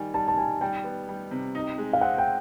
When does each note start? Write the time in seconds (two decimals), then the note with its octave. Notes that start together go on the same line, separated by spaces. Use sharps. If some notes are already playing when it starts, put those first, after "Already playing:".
Already playing: D#3 G3 G#5
0.14 G3 A5
0.28 A5
0.37 G3 G#5
0.61 G3 G5
0.84 B3
1.09 G3
1.31 C3
1.55 D#4
1.78 G#3
1.93 F5
2.01 C4 F#5
2.18 G5